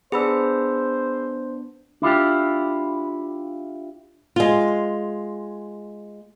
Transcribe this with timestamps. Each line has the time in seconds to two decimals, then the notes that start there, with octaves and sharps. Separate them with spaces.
0.12 B3 D4 G#4 C5 B5 E6
2.02 D4 E4 F4 G4
4.36 G#3 F4